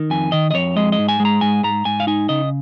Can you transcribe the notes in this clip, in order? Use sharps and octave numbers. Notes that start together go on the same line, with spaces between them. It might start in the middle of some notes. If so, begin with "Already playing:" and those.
Already playing: D#3
F2 G#5
D#3 D#5
D#5
F2 C#5
G#3 D#5
D#5
G#2
G#5
G#3
A#5
G#2 G#5
G#2 A#5
G#2 G#5
F5
D#4 G#5
C#3 D#5